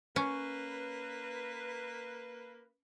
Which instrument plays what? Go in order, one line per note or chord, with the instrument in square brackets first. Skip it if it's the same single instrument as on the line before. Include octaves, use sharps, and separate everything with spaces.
[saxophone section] A#3 B4 [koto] C#4